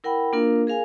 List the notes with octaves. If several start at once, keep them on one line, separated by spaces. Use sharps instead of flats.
E4 A#4 F#5 G5 B5
A#3 D4 F4 A#4 F5
G#4 A#4 F5 G#5